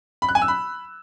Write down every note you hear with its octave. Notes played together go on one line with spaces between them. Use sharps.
B5
F#6
G#5
E6
B5